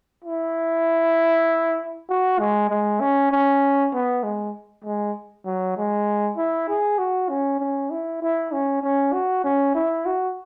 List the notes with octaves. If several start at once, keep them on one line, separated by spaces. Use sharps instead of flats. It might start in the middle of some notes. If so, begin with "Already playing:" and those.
E4
F#4
G#3
G#3
C#4
C#4
B3
G#3
G#3
F#3
G#3
E4
G#4
F#4
C#4
C#4
E4
E4
C#4
C#4
F#4
C#4
E4
F#4